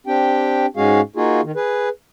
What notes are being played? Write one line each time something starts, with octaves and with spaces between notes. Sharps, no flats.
C4 D4 G4 G5
G#2 G#3 C#4 F#4 G#4 F5
A#3 D#4 F4 F#4 G#4
D#3
G#4 B4